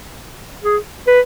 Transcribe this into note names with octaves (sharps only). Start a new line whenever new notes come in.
G#4
B4